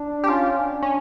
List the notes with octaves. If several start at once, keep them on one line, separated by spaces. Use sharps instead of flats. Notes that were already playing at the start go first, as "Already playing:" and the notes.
Already playing: D4
G4
C#4 F4
D4
C#4